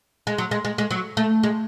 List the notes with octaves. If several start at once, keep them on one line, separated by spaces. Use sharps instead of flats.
G#3
F#3
G#3
G#3
G#3
F#3
A3
G#3